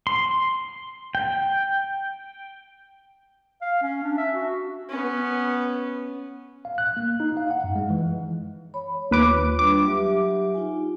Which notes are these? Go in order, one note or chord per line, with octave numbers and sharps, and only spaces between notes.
C6
G5
F5
C#4
D4
E5
F#4
B3 C#4
F5
F#6
A#3
D#4
F5
F#5
F#2
G#3
E3
C#5 B5
D#2 F4 B4 D6
G3 D4 B4 D6
F#3 G4 E5
D#4 F4 G#5